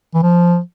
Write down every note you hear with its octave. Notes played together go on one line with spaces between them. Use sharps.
E3
F3